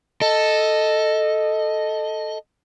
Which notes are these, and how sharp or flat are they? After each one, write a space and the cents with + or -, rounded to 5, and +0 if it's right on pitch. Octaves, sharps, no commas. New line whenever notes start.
A4 +0 D#5 +0